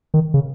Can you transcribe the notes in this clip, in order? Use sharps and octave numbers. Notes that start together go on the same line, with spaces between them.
D#3
C#3